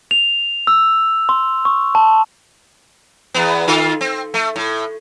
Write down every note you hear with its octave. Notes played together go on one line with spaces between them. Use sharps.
F7
E6
C6
C#6
A5
E2 B3
D#3 F4 A4
C4
A3
A2